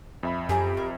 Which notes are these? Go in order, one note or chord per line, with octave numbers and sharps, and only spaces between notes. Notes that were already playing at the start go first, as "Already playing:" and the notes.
F2 E5 B5
F#2 G4 G#4 G#5 A#5
A#4